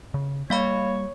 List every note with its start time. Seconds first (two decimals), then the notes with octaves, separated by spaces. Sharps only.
0.14 C#3
0.50 G3 A#3 C#5 F5 B5